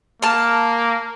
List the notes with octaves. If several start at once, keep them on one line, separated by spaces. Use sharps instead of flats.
A#3 A5 F6